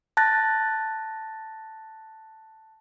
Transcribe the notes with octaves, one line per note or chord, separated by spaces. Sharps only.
A5 F#6 A6 A#6